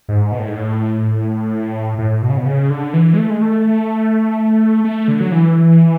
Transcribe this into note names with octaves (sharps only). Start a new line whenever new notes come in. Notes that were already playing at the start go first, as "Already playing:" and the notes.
G#2
B2
A2
G#2
A2
A2
B2
C#3
B2
C#3
D3
E3
G#3
A3
G#3
A3
A3
D3
F#3
E3